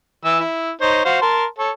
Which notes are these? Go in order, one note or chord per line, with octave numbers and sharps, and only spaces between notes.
E3 E4 E6
E4
D#4 C5 C#5
F#4 C5 F5
A#4 A5 C6
A4 C#5